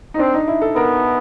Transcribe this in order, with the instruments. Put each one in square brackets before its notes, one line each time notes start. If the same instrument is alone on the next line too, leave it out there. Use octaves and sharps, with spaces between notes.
[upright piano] D#4
[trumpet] C4 [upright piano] D4
[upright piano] D#4
E4
A4
[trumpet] B3 [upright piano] A#4